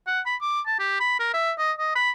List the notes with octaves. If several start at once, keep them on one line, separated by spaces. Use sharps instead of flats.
F#5
B5
D6
A5
G4
B5
A#4
E5
D#5
D#5
B5